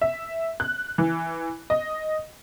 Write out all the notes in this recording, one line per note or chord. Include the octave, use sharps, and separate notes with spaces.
E5
F#6
E3
D#5